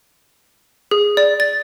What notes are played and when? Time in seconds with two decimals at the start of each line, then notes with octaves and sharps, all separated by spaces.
0.91 G#4
1.17 D5
1.40 A6